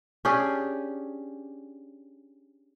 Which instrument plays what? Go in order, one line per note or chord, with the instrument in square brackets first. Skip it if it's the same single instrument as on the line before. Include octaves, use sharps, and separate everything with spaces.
[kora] C#4 D4 G4 G#4